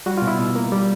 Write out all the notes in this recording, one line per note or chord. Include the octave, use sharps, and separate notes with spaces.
G3 F#4
B2 F4
E4
B2
A#3
G3